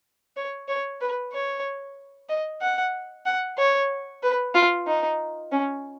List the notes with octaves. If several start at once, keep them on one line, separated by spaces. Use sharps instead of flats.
C#5
C#5
B4
C#5
D#5
F#5
F#5
C#5
B4
F4
D#4
C#4